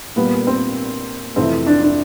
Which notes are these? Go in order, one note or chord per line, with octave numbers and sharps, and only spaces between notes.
A#2 G3 A#3 B3
C4
F2 C3 E3 A3 C4
D4
D4